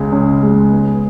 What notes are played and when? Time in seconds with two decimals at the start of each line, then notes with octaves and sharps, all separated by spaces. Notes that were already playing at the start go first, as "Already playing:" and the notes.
Already playing: C#2 C#3 G#3
0.12 C#4
0.43 G#3
0.72 B3